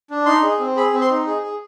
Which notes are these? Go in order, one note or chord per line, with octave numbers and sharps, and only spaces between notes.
D4
D#4 C6
G#4
C4
G#4 B5
C4
C6
D#4
G#4
G#4